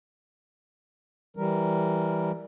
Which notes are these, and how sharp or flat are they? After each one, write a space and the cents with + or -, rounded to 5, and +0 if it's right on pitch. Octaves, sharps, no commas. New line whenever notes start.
E3 +0 G3 +0 A#4 +0